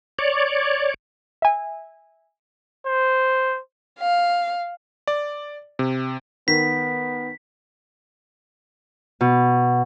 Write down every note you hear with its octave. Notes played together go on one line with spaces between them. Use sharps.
C#5 D5
E5 G#5
C5
F5
D5
C3
D#3 B3 B6
B2